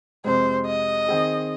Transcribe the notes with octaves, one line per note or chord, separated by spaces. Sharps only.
F2 C3 G#3 C5
D#5
D#3 C4 G#4